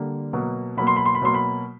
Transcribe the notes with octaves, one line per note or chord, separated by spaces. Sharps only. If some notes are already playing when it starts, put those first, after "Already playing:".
Already playing: D3 G3 A#3
B2 F#3 A#3
B2 F#3 A#3 B5
C6
B5
C6
B5
B2 F#3 A#3 C6
B5